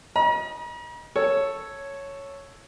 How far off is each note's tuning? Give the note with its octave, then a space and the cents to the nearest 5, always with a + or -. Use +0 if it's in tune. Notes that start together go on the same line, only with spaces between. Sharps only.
D#5 +0 A#5 +45
A4 +0 C#5 +0